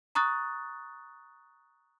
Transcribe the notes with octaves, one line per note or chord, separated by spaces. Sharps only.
A#5 C#6 D#6 F#6 A6